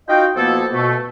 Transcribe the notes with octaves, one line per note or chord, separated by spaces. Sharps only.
D#4 F4 F#4 D#5 F5 G5
B2 F3 A#3 B3 E4 A4
B2 A3